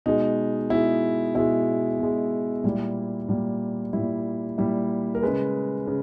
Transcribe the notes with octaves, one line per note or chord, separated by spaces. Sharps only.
B2 G#3 D#4
B2 G#3 E4
B2 G#3 E4
B2 G#3
A#2 G3 E4
A#2 G3
A#2 G3 E4
A#2 G3 E4
A#4
C#3 G#3 B4
C#3